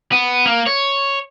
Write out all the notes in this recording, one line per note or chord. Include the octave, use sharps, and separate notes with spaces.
B3
A#3
C#5